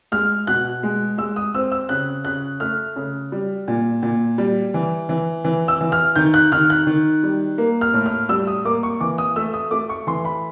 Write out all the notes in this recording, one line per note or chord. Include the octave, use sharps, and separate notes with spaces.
G#3 F6
B2 F#6
G#3
G#3 E6
D#6
C4 E6
E6
C#3 F#6
C#3 F#6
A3 F6
C#3
G3
A#2
A#2
G3
E3
E3
E3
E6
E3
F6
D#3 G6
F#6
D#3 F6
F#6
D#3
G3
A#3
F6
A2
F6
G3 E6
D#6
A#3 D6
C#6
E3 D6
D#6
A3 E6
D#6
A3 D6
C#6
E3 C6
B5